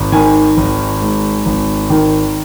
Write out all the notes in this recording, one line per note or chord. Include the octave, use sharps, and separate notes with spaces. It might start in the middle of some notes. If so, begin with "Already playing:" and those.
Already playing: G#1
D#3 G#5
G#1
G#2
G#1
D#3